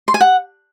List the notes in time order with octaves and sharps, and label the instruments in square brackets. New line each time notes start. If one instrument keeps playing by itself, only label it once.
[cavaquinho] C6
G#5
F#5